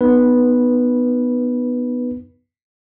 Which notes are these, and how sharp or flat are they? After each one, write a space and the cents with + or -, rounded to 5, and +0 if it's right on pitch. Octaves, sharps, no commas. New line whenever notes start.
B3 +0 D#4 -25 B4 -10